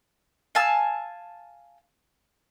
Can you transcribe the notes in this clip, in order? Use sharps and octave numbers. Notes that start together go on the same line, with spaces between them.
F5 G#5 A5 E6